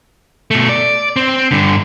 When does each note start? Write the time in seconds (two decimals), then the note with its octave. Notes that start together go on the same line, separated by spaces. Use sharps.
0.51 B2 A3
0.69 D5
1.16 C4
1.51 G2 D3